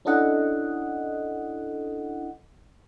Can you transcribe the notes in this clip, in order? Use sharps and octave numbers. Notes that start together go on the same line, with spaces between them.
C#4 D4 E4 A4 D#5 F#5